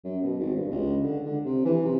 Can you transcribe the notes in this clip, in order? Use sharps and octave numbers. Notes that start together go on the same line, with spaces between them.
F#2
B2
G#1
G2
C#2
D3
D3
C3
E3
C3